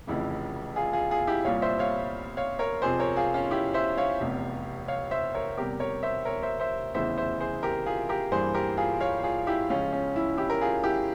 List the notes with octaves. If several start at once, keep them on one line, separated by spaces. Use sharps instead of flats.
F1 F2 C#3 E3 E4
F4 G#4
F4 G#4
F4 G#4
E4 G4
C2 A#2 G3 C#5 F5
C5 E5
C#5 F5
C#5 F5
A#4 C#5
F2 C3 F3 C4 G#4 C5
A#4 C#5
F4 G#4
C#4 F4
E4 G4
C5 E5
C#5 F5
F1 E2 C3
C#5 F5
C5 E5
A#4 C#5
E2 C3 G3 G4 A#4
A#4 C#5
C5 E5
A#4 C#5
C5 E5
C5 E5
F1 E2 C#3 E3 C5 E5
C5 E5
G#4 C5
G4 A#4
F4 G#4
G4 A#4
G2 E3 G3 A#3 G#4 C5
G4 A#4
F4 G#4
C#5 F5
F4 G#4
E4 G4
C#2 C#3 F3 C#4 F4
C#4
E4
E4 G4
A#4
F4 G#4
E4 G4